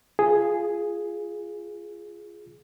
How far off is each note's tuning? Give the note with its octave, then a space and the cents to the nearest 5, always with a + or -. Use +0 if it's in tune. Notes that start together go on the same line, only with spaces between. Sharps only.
F4 -10 G#4 +0